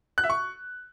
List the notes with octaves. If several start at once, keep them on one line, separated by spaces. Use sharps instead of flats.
F#6
E5
C#6